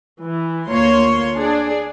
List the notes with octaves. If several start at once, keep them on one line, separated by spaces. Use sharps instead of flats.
E3
D2 A#3 F4 C#5 C6
D4 G#4 D5